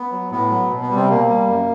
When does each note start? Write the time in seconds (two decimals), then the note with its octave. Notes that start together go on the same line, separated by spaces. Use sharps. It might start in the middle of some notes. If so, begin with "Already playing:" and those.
Already playing: B3
0.11 F#3
0.31 A2 B3
0.50 F#3
0.70 B2
0.82 B3
0.90 G3
0.95 C3 C4
1.08 B2 A#3
1.28 G3
1.47 F#2